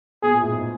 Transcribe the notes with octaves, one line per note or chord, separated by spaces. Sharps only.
B2 G#4
A#2
A2
G#2